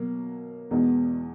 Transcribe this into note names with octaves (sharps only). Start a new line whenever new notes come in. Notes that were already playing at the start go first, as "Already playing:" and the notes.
Already playing: B2 F#3 A#3
E2 B2 G#3 B3 D#4